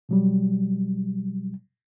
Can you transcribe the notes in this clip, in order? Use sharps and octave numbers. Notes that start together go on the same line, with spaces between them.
B2 F#3 G3